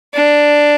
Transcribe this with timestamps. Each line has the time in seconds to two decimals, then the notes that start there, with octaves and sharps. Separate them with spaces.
0.14 D4